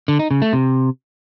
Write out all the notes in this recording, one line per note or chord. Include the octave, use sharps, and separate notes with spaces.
D3
D#4
C#3
A3
C3